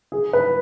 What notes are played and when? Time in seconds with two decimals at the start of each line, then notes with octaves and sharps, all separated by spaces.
0.12 G#4
0.33 B4